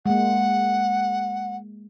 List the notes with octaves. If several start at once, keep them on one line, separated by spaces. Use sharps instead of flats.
G#3 A#3 F#5